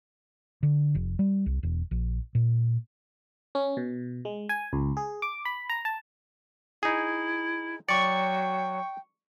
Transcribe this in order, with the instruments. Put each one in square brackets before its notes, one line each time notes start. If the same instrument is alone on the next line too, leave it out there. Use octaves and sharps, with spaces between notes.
[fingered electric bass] D3
F1
G3
C2
E1
A#1
A#2
[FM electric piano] C#4
B2
G#3
G#5
C#2
G#4
D6
B5
A#5
A5
[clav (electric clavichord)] D#4 G#4 [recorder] E4
[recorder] F#3 [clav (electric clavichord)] D5 [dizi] G5 [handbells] C#6 C#7